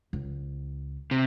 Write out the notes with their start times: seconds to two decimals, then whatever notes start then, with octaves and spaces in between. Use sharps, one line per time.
0.13 C#2
1.11 C3